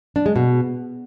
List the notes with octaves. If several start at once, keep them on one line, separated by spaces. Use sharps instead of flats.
D4
G#3
B2